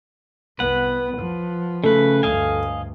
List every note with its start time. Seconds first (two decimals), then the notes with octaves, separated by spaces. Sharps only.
0.59 C2 B3 B4 F#5
1.18 F3
1.84 C#3 A3 B4
2.23 D2 G2 D#5 F5 G#5